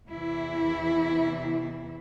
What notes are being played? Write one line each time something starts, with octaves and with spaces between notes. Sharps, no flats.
E2 C3 E3 E4